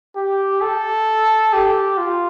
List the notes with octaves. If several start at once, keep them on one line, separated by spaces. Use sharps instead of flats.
G4
A4
G4
F4